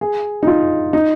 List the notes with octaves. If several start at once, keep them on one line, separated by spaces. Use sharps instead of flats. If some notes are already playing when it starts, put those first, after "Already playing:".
G#4
D#4
F4
D#4